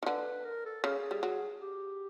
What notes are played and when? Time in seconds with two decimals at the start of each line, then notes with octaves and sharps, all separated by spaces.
0.03 D#3
0.06 D3 B4
0.45 A#4
0.65 A4
0.84 C#3 G#4
1.11 G3
1.23 F#3
1.61 G4